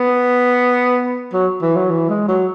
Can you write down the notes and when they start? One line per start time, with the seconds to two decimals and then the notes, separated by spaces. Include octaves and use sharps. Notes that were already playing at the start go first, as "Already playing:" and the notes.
Already playing: B3
1.33 F#3
1.62 E3
1.76 F#3
1.90 E3
2.09 G#3
2.28 F#3